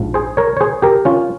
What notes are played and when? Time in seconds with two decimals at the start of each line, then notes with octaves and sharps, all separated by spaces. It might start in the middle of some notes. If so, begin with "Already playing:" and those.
Already playing: A#1 G#2 F3
0.14 G#4 C5
0.37 A#4 C#5
0.57 C#5
0.61 G#4 C5
0.82 G4 A#4
1.05 C#4 F4